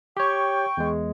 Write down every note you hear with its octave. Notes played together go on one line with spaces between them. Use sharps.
G4 C#5 G5 C#6
E2 G#3